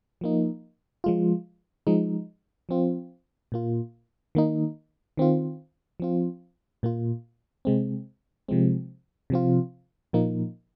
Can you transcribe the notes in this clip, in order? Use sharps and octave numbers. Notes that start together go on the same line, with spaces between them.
F3 A#3 D#4
F3 G#3 F4
F3 G#3 D#4
F3 C4 F4
A#2 A#3 F4
D#3 A#3 D#4
D#3 C4 F4
F3 C4 F4
A#2 A#3 F4
C3 G#3 C4
C3 F3 G#3 C4
C3 F3 C4 F4
A#2 F3 A#3 D#4